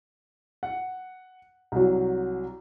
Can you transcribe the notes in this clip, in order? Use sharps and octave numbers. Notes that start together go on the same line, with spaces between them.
F#5
C2 F#3